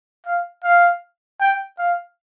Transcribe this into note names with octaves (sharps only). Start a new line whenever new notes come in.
F5
F5
G5
F5